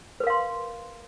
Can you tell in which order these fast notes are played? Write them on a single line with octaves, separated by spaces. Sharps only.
B4 A#4 F5 C6